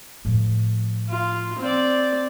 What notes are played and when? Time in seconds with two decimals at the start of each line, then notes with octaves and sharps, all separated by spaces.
0.25 A2 F3
1.09 F4
1.60 C4 D5